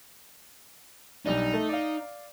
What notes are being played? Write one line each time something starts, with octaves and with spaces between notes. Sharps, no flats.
B1 G3 D4 D#4
A3
D5 F5